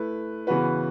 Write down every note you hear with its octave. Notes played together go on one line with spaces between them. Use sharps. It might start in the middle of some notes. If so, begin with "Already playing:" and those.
Already playing: A3 E4 B4
C#3 E3 B3 F#4 B4